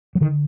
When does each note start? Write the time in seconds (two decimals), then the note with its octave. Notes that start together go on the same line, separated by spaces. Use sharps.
0.15 F#3
0.21 D3 D#3